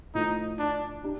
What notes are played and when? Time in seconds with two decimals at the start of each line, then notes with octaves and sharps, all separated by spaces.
0.15 A2 F3 A3 D#4
0.59 D4
1.04 D4 G4